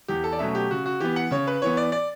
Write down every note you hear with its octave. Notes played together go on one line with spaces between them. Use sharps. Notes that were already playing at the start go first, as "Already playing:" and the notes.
E2 G4
A4
D5
B2 F#3 A3 C#4 E5
G4
C#3 F#4
F#4
E3 B3 G4
F#5
C#3 C#5
B4
E3 B3 C#5
D5
D5